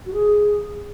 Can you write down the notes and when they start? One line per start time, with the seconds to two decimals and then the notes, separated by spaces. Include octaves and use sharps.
0.05 F#4
0.13 G#4